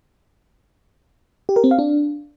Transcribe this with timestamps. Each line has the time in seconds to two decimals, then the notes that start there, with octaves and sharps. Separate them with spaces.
1.49 G4
1.56 A#4
1.64 C4
1.71 F5
1.79 D4